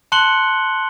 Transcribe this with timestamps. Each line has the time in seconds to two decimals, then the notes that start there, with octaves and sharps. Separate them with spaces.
0.12 A5 C6 F#6 C#7 F#7 G7